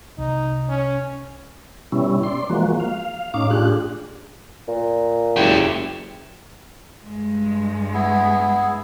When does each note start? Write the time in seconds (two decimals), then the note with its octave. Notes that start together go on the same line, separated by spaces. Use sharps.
0.18 C2 D#4
0.68 C#4
1.92 B2 G3 C#4 E4
2.23 D5 C6
2.50 E3 F3 G#3 A#3 F#4
2.80 F5
3.34 A2 C#4 D#4 F5 D6
3.50 A2 D4 F4 G4 G#4 F#6
4.68 A#2
5.36 F#1 E4 G4
7.05 G2 G#3
7.94 B3 E4 G#4